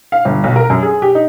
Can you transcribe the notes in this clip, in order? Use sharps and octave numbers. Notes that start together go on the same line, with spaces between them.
F5
G1
B1
A#4
F#2
G#4
G4
D#4